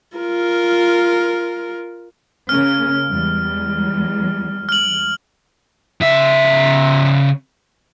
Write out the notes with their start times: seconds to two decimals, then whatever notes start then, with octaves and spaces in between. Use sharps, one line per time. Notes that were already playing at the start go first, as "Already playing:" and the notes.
0.18 F4 A#4
2.49 C#3 A#3 C#4 F6
3.08 E2 G3 G#3
4.69 F6 F#7
6.01 C#3 E5